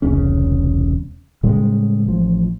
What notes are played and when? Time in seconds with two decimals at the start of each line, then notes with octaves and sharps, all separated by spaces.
0.02 E1 C2 C#3 C#4
1.43 A2 C#3 G3 G#3
2.04 A1 F3